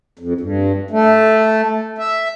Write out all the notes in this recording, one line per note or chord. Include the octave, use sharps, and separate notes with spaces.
F2
G2
A3
E5